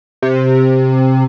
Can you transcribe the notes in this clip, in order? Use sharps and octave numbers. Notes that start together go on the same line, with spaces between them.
C3